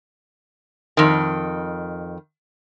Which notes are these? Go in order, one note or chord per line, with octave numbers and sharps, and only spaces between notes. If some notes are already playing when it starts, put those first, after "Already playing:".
F2 D#3